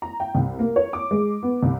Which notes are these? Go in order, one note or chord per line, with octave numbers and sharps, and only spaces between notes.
A#5
G5
C2
A#3
C#5
D6
G#3
B3
C2